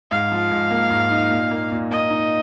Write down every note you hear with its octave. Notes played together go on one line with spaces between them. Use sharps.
G#2 F5
F3
G#2
A#3
G#2
D#4
A#2
A#3
A#2
A#3 D#5
D#4